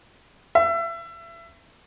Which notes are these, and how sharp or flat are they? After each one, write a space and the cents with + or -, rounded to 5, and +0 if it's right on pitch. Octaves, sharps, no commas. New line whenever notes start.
E5 +30